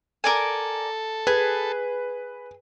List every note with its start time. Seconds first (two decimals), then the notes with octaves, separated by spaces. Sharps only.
0.24 A4 A#4 D5 G#5
1.27 G#4 B4